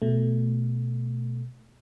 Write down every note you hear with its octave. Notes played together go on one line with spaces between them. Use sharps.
B2 A3